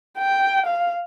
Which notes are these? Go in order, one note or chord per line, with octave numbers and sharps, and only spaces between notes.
G5
F5